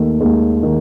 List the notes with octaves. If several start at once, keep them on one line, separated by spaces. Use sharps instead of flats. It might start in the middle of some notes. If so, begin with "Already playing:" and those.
Already playing: D#2 D#3 A3
D#2 G#3
D#3